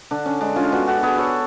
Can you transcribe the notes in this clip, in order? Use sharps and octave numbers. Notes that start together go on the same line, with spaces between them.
D3 D4
C#4
G#3 D4
C#4 F4
B3 D4 F#4
F#4 A4
B3 G#4 B4
A4 C#5